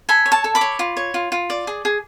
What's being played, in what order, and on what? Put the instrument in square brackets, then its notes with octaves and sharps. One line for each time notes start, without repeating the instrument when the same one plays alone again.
[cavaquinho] A4 G#5 B5
C#5
A5 C#6
A4
B5 D6
C#5
F4
C#5
F4
F4
D5
G#4
G#4